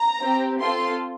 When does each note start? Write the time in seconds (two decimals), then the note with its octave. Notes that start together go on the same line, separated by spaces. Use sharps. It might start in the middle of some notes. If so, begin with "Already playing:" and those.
Already playing: A#5
0.20 C4 G4
0.59 C4 F4 A4 C6